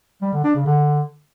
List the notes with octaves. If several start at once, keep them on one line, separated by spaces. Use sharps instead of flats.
G3
D3
D4
C#3
D3